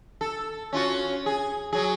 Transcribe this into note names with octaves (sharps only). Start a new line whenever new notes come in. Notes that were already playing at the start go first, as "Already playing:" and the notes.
A4
C#4 F4 F#4
G#4
F#3 G#4